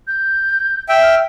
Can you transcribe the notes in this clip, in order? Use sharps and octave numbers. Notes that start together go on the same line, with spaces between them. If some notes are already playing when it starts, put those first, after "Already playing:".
G6
E5 G5
F6